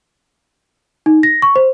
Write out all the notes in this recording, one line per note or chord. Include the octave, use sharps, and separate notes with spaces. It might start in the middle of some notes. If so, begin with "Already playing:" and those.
D#4
A#6
C#6
C5